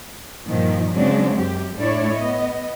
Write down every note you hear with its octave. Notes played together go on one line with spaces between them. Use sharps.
G2 A#2 D#3 F3
C#3 F#3 G#3 C4 D4
F#2 G4
A2 D4 E4 C#5 D5
B3 D#5